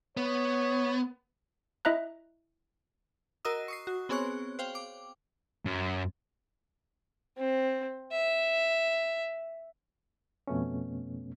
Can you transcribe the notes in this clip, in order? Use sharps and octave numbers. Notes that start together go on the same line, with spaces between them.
B3 C#5
E4 D#5 E5 A#5 F#6
F#4 A#4 D#5 D#6 E6
C#6 D#6 C7
F#4
B3 C4 G#4 C#5 C#6 F#6
C5 F5 G5
D6
F#2
C4
E5
F2 B2 A3 B3 C#4